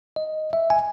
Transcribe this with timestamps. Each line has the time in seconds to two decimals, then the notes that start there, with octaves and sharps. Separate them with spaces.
0.16 D#5
0.53 E5
0.70 G#5